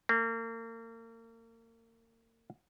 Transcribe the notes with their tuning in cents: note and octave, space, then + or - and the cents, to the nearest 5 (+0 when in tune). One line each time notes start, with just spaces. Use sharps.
A#3 -35